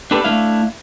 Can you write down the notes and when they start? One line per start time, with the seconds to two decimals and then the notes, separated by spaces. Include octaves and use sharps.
0.11 D4 G4 A4 B4
0.24 A3 D4 E4 F5